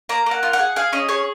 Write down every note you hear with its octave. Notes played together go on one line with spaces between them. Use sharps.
A#3 A#5
A#3 F#5
F4
F#5
G#4
G#4 F5
C#4 D#5
G#4 C#5